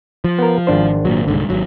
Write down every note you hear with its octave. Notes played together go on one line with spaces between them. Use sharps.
F3
B3 A#4
G#1 D4 C5
A#2 F#3
C2 G#2 D3
G#1 F#3